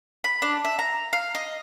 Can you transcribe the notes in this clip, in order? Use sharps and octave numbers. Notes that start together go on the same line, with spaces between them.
B5
D4
E5
A#5
F5
D#5